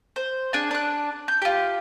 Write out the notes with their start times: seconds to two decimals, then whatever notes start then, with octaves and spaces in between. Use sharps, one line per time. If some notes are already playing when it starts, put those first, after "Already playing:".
0.16 C5
0.53 D4 G#4 G#5 A5
0.71 D4 F#6
1.28 G6
1.42 F4 G4